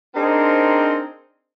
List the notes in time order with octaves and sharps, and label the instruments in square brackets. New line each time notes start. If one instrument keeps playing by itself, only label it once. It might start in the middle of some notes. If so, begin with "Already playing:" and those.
[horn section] C4 D4 D#4 G#4 A#4 C5